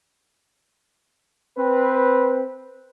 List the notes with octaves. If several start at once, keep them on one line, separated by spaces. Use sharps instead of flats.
C4 B4